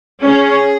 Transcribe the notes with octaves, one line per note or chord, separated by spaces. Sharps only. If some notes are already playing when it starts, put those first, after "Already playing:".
C#4 G#4